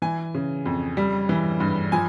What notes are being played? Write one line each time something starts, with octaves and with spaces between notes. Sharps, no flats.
E3 G#5
C#3
F2
G3
E3
G2
F3 G#5